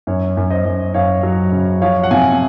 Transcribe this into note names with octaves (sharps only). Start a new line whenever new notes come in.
F#2 C#5
F#2
C5 D#5
F#2
F#2 C#5 F5
F#3
C#3
F3 C#5 F5
F#5
C3 F5 G#5